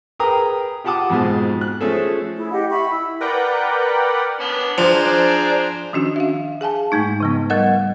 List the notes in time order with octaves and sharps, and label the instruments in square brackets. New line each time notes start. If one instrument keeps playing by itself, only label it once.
[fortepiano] G#4 A#4 B4 G5 A#5 D#6
F4 G4 F#5 A5 D6 D#6
F2 G#2 B2 G#3
F#6
F3 A3 C#4 G#4 A4
[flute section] E4 G#4
G4 D#5 F#5
E5 B5 C#6
E4 E6
[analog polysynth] A#4 B4 D5 F#5 G5
[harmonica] B3 C#4 D4
[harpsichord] F3 [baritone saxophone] D4 [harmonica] G#4 C5 A#5
[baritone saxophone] D4
[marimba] D#3 F3 C#4 D4 F#4
E5 F5
G#4 F5 G#5 A5
G#2 G#3 A3 D#4
C#3 F3 B3
G3 A#4 D#5 F#5 A6